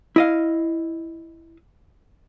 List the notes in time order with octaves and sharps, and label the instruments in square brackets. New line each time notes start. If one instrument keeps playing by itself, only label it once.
[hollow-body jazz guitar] E4 D#5 F5